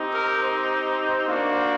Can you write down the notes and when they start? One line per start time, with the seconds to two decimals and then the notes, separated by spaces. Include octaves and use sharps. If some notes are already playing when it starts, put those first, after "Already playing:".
Already playing: C4 D#4 G4
0.13 A#4
0.42 C5
1.27 A#3 D4 F#4